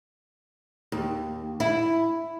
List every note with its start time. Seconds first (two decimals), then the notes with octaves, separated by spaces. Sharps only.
0.92 D#2
1.60 E4